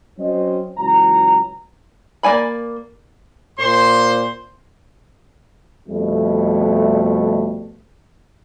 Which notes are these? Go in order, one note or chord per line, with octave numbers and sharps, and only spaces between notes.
F#3 C4 C#4 C5 D#5
C#2 E3 F#3 G#5 A#5
A#3 D5 G#5 B5
A#2 C5 C6
F2 B2 G3 A3